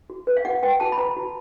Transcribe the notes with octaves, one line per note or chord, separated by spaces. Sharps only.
F#4
B4
F5
F#4 F#5
B4 G5
F#4 A5
B5
B4 A#5
F#4